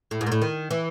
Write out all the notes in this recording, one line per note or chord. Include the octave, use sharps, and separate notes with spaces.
A2
G#2
A#2
A2
D#3
E3